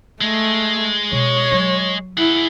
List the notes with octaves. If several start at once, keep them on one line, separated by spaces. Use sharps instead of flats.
G#3 A3
B2 C#5
F#3
E4 G#4 F#5